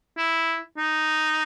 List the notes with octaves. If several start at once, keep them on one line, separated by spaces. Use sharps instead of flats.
E4
D#4